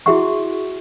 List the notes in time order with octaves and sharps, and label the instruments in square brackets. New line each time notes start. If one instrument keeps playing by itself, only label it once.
[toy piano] E4 F#4 G#4 E5 F#5 C#6